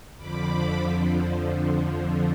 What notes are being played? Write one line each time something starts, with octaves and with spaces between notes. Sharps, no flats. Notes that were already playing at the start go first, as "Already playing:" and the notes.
F2 D3 F3 B5 D6
F2 D3 F3